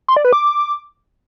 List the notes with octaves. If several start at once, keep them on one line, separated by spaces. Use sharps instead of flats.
C6
D5
B4
D6